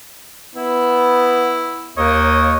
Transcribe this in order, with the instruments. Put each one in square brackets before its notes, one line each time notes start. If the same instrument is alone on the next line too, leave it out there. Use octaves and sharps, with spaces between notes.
[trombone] B3 [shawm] E4
[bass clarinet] D#2 [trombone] A#3 [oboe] C#5 [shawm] D#5